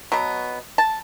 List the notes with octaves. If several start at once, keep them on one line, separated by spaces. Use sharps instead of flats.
B2 F#3 B3
A5